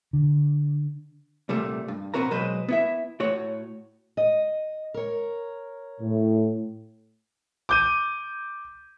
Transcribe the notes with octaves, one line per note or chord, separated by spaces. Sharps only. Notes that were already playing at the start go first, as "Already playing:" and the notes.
D3
C2 A#2 G3 A3
G2
A#2 B3 C4 F#4 A#4 A#5
B2 F#3 G#3 B4 C5 D#5
B3 E4 E5
A2 F#4 C#5
D#5
A#4 C#5
A2
D6 G6 D#7